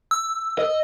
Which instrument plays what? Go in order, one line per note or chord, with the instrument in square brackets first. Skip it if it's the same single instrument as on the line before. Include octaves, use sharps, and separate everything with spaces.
[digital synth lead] E6
[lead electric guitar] D#5